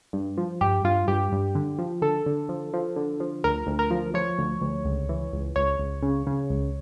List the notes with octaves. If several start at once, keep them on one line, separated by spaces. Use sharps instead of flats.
G2
F3
G2 G4
G2 F4
G2 G4
G2
D3
F3
D3 A4
D3
F3
F3
D3
F3
D2 A#4
D2
A#4
F3
F3 C#5
D2
D2
C#2
E3
C#2
C#2 C#5
C#2
C#3
C#3
C#2